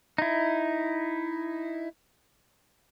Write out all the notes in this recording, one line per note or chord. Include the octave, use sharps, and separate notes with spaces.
D#4 E4